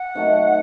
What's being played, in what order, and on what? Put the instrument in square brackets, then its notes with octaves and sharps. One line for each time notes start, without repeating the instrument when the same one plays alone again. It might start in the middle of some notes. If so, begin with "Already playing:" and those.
Already playing: [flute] F#5
[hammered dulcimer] C3 D#3 F#3 A3